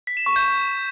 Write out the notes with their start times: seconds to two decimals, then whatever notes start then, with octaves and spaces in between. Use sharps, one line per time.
0.07 B6
0.17 E7
0.26 C#6
0.36 G6